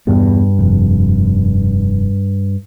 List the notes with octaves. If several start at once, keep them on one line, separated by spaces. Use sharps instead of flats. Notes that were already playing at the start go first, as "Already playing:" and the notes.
E2 G2 B2
F1